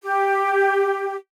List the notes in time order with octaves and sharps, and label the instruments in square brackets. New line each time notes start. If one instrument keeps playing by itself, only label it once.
[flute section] G4